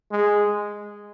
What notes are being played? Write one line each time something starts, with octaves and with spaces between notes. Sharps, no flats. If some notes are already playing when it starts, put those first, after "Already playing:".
G#3